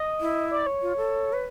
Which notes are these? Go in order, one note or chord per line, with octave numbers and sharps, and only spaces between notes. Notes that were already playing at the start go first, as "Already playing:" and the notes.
Already playing: D#5
E4
D5
C#5
F4
A4
B4